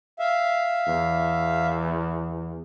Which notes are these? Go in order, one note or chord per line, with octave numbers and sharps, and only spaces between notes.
E5 F5
E2